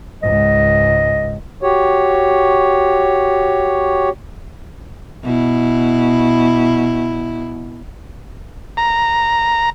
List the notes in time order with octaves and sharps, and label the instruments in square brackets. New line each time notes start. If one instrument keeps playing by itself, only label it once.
[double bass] C#2 G#2 [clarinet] D#5
[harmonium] F#4 G4 C#5
[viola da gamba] B2 E4
[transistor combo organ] A#5